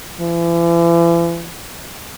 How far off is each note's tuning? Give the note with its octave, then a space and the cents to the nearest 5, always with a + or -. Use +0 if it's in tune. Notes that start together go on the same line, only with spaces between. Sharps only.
E3 +40